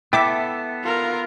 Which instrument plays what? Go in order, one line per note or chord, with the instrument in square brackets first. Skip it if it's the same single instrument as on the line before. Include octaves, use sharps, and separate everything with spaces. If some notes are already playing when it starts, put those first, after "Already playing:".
[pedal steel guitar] B3 A4 [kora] E4 E5 [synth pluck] G5 D6 B6
[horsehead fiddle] F4 A#4